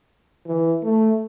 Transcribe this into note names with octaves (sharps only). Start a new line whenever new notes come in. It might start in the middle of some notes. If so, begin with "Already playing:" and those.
E3
A3